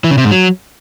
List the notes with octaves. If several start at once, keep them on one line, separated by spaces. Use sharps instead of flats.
E3
C#3
C3
G#2
F#3